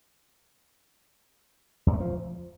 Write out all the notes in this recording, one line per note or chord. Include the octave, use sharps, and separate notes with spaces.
E2
A3
F3